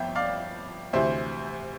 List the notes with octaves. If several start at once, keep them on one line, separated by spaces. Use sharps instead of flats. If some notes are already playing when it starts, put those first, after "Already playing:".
Already playing: G1 F2 B3 E5 G5
D5 F5
D2 C3 E3 C5 E5